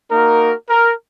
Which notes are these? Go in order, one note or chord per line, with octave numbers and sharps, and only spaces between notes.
A#3 D#4 F#4 A#4
A#4